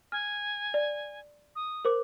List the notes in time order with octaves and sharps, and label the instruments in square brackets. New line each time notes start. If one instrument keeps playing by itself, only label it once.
[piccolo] G#5 [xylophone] F6
[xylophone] D5
[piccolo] D#6
[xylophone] A#4 C5 D6